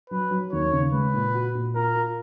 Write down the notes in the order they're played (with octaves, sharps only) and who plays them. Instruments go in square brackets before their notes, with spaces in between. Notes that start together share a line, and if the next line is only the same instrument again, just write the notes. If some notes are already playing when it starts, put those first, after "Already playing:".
[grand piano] F#3 [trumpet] B4
[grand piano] F#3
[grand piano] D#2 [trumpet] C#5
[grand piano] C#3
[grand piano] G#3 [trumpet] B4
[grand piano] A#2
F#4
A#2
[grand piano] F4 [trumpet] A#4
[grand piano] F4